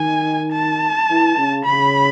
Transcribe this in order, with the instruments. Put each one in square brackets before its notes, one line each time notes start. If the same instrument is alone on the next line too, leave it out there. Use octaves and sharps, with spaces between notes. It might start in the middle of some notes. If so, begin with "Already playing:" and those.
Already playing: [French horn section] D#3 [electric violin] G#5
[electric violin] A5
[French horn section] E3
C#3
[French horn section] C#3 [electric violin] B5